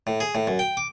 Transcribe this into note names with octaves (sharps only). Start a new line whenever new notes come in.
A2
G#4
A2
F#2
G5
D6